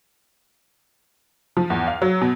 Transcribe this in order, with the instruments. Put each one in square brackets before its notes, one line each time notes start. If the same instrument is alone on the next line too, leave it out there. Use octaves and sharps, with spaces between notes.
[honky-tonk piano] F3
E2
F5
F#3
B2